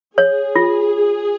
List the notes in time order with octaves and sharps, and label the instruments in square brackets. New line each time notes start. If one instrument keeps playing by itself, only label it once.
[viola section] G#4 [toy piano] C#5
[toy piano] F4